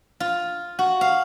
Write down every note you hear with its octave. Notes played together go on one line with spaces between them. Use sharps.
F4
F#4
F5